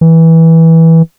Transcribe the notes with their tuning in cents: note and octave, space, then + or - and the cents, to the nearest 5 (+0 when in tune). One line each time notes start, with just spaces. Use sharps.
E3 -15